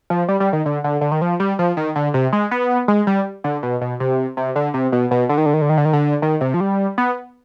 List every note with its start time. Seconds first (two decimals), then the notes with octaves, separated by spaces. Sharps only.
0.10 F3
0.29 G3
0.40 G3
0.53 D#3
0.66 D3
0.84 D3
1.01 D3
1.11 D#3
1.22 F3
1.40 G3
1.59 F3
1.77 D#3
1.96 D3
2.14 C3
2.33 G#3
2.51 B3
2.88 G#3
3.07 G3
3.44 D3
3.63 B2
3.81 B2
4.00 C3
4.37 C3
4.56 D3
4.74 C3
4.92 B2
5.11 B2
5.29 D3
5.38 D#3
5.46 D3
5.54 D#3
5.62 D3
5.69 D#3
5.78 D3
5.85 D#3
5.93 D3
6.22 D#3
6.41 C3
6.54 F3
6.60 G3
6.98 B3